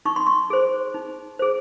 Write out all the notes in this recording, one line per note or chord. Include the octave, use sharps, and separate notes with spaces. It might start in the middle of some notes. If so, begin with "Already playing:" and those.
D#4 C#6
C6
C#6
G#4 C5
D#4
G#4 C5